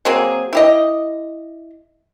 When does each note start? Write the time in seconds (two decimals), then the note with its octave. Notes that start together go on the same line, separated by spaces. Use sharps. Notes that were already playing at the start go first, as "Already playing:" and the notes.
0.05 F#3 A#3 C4 G#4
0.53 E4 G4 D#5